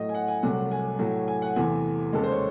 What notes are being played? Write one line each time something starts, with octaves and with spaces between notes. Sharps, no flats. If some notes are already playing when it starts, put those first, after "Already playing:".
Already playing: A2 F#3 A3 D#5
G#5
F#5
G#5
C2 C3 F#3 A3 F#5
G#5
A2 F#3 A3
G#5
F#5
E2 C3 E3 A3 G#5
D#2 C#3 G#3 A4
C5
C#5